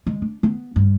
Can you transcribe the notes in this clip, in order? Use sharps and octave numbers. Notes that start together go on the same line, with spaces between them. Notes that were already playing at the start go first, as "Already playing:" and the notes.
G#3
D4
B3
G2